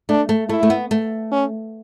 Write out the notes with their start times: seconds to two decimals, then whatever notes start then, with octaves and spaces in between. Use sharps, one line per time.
0.09 A3 D4
0.29 A3
0.49 A3 E4
0.63 A3
0.70 B3
0.91 A3
1.32 C#4